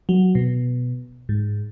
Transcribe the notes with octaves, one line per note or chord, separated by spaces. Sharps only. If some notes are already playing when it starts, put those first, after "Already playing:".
F#3
B2
G#2